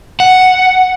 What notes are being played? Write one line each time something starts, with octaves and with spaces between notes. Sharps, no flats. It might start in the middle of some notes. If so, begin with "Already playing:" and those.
F#5